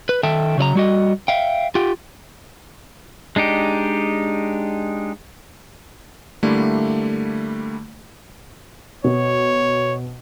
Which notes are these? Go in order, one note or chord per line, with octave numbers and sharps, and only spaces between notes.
B4
D#3 A4 E5 G5 A5
C#3 F#3 D5 A#5
G3 F#4 D#5
E5 F5 G5
F4 G4 G5
G#3 D4 D#4 G4
D3 G3 A3 A#3 E4
B2 C#5